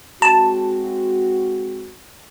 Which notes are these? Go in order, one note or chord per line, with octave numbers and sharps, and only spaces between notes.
G#3 C4 F#4 A5